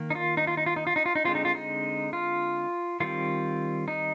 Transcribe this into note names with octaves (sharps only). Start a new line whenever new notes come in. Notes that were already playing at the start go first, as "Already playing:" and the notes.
Already playing: D#3 A#3
D#4
F4
D#4
F4
D#4
F4
D#4
F4
D#4
F4
D#4
D3 G#3 C4 F4
D#4
F4
D#4
F4
D#3 G3 C4 F4
D#4